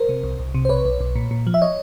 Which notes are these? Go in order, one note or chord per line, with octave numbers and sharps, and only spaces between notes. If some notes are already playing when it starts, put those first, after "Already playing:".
Already playing: A#4 C5
C3
C2
C2
C3
C5
B1 B4 C#5
B1
B1
A#2
A#2
F3
E5
C#5 D#5